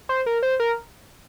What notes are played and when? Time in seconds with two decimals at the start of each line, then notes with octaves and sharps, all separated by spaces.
0.09 C5
0.26 A#4
0.43 C5
0.60 A#4